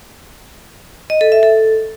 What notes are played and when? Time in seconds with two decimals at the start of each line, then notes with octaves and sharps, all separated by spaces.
1.10 D#5
1.21 A4
1.32 E5
1.43 A4